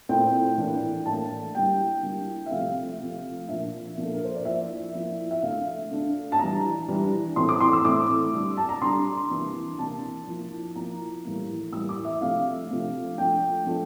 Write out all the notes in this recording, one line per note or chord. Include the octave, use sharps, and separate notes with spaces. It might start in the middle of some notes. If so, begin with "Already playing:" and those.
A#2 A3 C4 E4 G5
A2 E3 A#3 D4
A2 E3 A#3 D4 A5
D3 G3 A#3 E4 G5
D3 G3 A#3 E4
E5
C3 F3 A3 F5
C3 F3 A3
A#2 F3 A#3 D4 E5
A#2 F3 A#3 D4
A4
A#4
C5
D5
F3 A#3 E4 E5
F3 A#3 E4
E5
D3 A3 D4 F5
D3 A3 D4
A5
E3 G3 D4 A#5
E3 G3 D4
A2 E3 A3 C4 E4 C6
D6
C6
E6
A2 E3 A3 C4 E4 D6
D3 G3 D4
A5
A#5
D3 G3 D4 C6
C3 E3 A#3 D4
C3 E3 A#3 D4 A5
F3 A#3 E4
F3 A#3 E4 A#5
A2 E3 G3 A#3 E4
A2 E3 G3 A#3 E4 E6
D6
E5
C3 F3 A3 D4 F5
C3 F3 A3 D4
F3 A3 D4 G5
F3 A3 D4